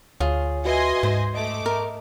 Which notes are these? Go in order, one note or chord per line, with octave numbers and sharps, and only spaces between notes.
D2 F4 G#4 C#5
F#4 B4 D#5 E5 G#5 C6
G#2 C5
A3 D#5 D6
A#4